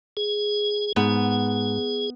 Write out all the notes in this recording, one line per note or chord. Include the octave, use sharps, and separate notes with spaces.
G#4
G#2 B3 G#4